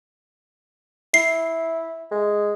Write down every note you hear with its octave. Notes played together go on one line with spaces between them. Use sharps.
E4 C7
G#3